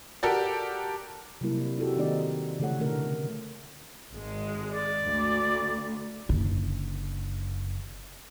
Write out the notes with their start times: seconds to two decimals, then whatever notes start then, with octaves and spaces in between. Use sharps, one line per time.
0.23 F#4 G4 A4 A#4 D5
1.41 C3 F#3 G3 A#3 E4 A#4
1.78 C4 D#4 E4 F#4 G4 A4
1.97 D#3 A#3 C4 D#4 D5
2.59 C#3 E3 A3 A4 C#5 F#5
2.79 B2 D3 A3 D4 A#4
4.10 G#1 G#3
4.73 D5
5.05 D2
6.29 F#1 D3